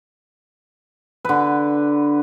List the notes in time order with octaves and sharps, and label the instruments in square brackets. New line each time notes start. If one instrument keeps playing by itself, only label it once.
[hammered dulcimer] D3 B4